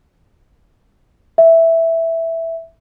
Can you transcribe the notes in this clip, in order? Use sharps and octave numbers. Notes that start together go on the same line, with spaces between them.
E5